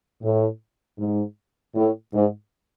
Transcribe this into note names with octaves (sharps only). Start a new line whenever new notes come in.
A2
G#2
A2
G#2